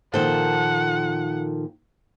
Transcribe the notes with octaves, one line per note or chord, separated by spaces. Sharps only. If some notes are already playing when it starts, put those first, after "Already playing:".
A#2 D#3 F3 A4 C5 F#5